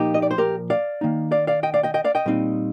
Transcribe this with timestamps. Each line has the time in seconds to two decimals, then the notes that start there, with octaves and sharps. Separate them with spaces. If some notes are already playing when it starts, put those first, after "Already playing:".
Already playing: A#2 F3 A#3 D#4 G4
0.14 D#5
0.22 D5
0.31 C5
0.38 G4 A#4
0.70 D5 F5
1.01 D#3 A#3 D#4
1.32 D5 F5
1.47 D5 F5
1.63 D#5 G5
1.74 D5 F5
1.83 D#5 G5
1.94 D#5 G5
2.04 D5 F5
2.15 D#5 G5
2.26 A#2 G3 C4 D#4